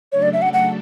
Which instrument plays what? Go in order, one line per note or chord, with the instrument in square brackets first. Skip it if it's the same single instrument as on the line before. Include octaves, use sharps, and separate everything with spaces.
[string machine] C#3 F#3 A3 D4 A4 [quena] C#5
[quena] D5
E5
F#5
F#5